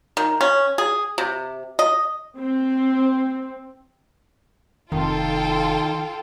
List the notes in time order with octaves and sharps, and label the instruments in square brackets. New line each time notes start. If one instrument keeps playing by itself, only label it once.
[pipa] D#3
C#4
G#4
C3
D#5
[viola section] C4
[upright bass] F1 [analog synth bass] D#3 [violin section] F4 A4 G5